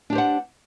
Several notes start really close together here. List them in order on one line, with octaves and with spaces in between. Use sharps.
D4 G4 C5 F#5